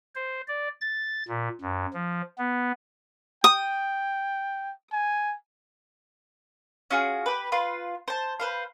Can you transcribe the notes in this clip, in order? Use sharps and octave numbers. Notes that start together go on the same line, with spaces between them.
C5
D5
A6
A#2
F#2
F3
B3
G5 D#6
G#5
C#4 F4 F#4 G#4
G4 B4
F4 B4 C6
C5 A5
B4 C5 F5